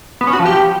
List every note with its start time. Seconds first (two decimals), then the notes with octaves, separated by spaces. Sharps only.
0.21 B3
0.27 C#4
0.33 F#4
0.39 F3
0.46 G4